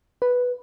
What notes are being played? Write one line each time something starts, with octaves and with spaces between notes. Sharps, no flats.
B4